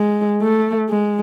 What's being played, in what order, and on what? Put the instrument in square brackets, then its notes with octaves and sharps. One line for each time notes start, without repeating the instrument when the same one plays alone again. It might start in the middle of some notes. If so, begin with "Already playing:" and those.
Already playing: [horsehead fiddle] G#3
A3
G#3